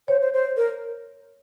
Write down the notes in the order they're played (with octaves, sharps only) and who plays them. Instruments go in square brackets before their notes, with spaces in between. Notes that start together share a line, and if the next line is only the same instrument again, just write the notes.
[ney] C5 [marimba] C#5
[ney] C5
C5
A#4